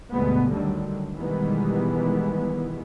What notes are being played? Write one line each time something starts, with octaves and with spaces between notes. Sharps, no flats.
D2 G2 B2 G#3 B3
D3 D#3 F#3 G3
B2 D#3 E3 G3 G#3 B3